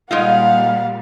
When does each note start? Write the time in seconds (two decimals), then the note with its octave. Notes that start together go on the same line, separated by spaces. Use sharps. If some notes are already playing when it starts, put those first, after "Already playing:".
0.11 A#2 G3 G#3 D#4 F4 F5 F#5